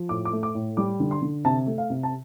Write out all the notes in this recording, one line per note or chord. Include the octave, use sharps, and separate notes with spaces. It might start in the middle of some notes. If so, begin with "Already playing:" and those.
Already playing: F3
A2 D6
D6
A3
D6
A2
G3 D6
D3
C6
D3
C3 A5
A3
F5
C3
A5